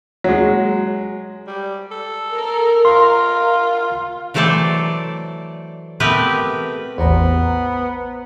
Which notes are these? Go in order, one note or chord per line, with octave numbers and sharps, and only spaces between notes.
F#3 G#3
G3
A4
A#4
F4 C6
E3 F#3 A3 A4 C5 D5
A3 B3 C4 G4 A#4 B4
A1 E2 B3 B4 C5 A#5